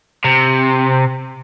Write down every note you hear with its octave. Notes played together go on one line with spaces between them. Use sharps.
C3